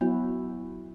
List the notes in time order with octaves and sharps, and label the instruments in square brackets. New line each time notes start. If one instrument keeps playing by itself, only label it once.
[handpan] F#3 E4 F#4 [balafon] B3